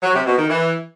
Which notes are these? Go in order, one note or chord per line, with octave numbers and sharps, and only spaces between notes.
F#3
C3
B2
D#3
E3